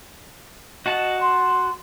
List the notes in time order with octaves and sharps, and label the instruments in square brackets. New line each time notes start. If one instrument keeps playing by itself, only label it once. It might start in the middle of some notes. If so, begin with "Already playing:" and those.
[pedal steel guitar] F#4 F#5 A5 [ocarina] D#5
[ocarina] C6